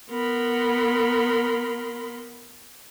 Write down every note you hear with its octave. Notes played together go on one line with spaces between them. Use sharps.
B3 A#4 B5 C6